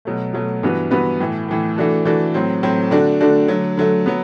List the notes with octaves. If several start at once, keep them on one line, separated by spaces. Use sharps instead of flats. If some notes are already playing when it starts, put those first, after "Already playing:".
B2 F#3 A3
B2 F#3 A3
G2 E3 B3 F#4 B4
G2 E3 B3 F#4 B4
A2 E3 A3
A2 E3 A3
E3 A3 D4 F#4 A4
E3 A3 D4 F#4 A4
A2 F#3 C4
A2 F#3 C4
D3 A3 D4 F#4
D3 A3 D4 F#4
D3 F#3 A3
D3 F#3 A3
F#3 B3